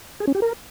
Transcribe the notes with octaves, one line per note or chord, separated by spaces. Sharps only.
G#4
C#4
G4
A#4